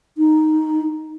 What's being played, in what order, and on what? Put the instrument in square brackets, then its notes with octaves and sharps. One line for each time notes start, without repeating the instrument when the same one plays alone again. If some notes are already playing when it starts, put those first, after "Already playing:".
[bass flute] D#4